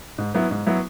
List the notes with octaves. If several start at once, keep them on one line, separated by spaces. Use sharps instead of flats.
G#2
F#3 B3 E4
G#2
F#3 B3 E4